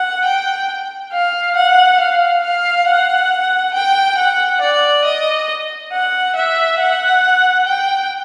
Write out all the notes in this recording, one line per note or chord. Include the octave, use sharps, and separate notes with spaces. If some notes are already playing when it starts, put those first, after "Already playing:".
Already playing: F#5
G5
F5
F#5
F5
F5
F#5
G5
F#5
D5
D#5
F#5
E5
F#5
G5